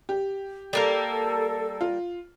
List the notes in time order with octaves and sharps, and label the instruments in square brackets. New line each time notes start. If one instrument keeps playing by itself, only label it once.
[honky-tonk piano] G4
[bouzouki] G3 A#3 A#4 [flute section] A4
[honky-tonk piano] F4